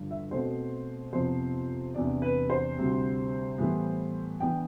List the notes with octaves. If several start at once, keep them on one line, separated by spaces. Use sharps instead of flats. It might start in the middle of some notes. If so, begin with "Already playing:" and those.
Already playing: G2 D3 F3
E5
B2 A3 C4 C5
F2 C3 F3 B3 C5
E2 C3 E3 B3 D4 D5
B4
C5
D2 C3 G3 C4
A2 E3 G3 B3
E3 B3 D4 G5